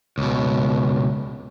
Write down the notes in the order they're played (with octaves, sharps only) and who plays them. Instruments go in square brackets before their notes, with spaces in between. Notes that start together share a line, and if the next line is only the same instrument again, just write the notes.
[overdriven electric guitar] C#2 B2